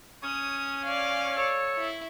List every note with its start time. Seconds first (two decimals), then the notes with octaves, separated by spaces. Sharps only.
0.23 C#4 D#6
0.84 D5 F5
1.37 A4 C#5
1.78 E4